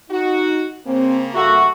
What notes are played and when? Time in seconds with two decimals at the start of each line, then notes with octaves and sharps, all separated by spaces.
0.11 D#4 F#4
0.87 C#3 A#3 C4
1.35 G2 F#4 A4 E5